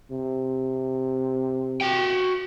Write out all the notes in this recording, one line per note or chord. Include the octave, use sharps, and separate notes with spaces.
C3
F#4 G5